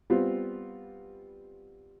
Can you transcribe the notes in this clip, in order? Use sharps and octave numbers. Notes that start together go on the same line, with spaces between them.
G3 B3 C4 F4